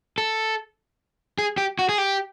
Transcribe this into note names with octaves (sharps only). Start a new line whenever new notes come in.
A4
G#4
G4
F#4
G#4
G4